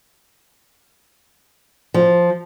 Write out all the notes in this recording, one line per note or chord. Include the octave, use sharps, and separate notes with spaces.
F3